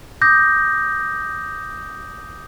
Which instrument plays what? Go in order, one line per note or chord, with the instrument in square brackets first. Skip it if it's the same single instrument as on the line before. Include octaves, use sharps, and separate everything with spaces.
[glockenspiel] D6 D#6 G6 A#6